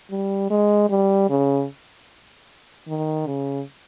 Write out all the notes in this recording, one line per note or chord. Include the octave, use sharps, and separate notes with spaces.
G3
G#3
G3
C#3
D#3
C#3